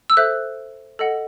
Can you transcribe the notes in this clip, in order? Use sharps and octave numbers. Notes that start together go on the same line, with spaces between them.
E6
A4 C5 E5 F#6
A4 D#5 F#5